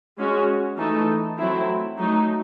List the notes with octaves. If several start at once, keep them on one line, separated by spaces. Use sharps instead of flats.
G#3 C#4 F#4 C#5
E3 A3 D#4 A4
F#3 A3 C4 E4
F#3 A3 D#4